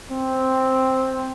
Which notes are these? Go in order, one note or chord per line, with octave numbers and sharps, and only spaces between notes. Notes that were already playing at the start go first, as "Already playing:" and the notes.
C4